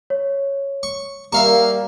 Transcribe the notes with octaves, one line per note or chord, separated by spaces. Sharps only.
C#5
C#6
G3 A#3 E5 F5 A#5 C#6